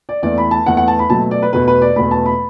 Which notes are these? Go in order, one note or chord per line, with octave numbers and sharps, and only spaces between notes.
D5
E2 E3 A3 D5
B5
A5
E2 E3 A3 F#5
F#5
A5
B5
B2 F#3 A3 A5
D5
B4
E2 B2 A3 B4
B4
D5
E2 B2 A3 B5
A5
B5